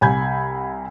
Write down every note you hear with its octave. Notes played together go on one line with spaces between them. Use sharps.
C2 G#5 B5 G6 G#6